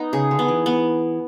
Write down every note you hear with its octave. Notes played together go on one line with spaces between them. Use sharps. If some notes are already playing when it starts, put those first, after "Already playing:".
Already playing: B3 D#4
C#3 G#4
D3
B3
E3
B3